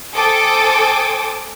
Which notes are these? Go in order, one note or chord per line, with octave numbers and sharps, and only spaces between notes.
A4 C5 G5 G#5 D6 D#6